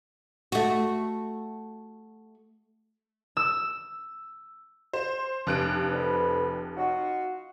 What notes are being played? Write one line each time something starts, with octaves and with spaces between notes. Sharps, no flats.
A3 F#4
E6
C5
F1 G2 F#6 D7
F2 B4
D#4 F4 F#4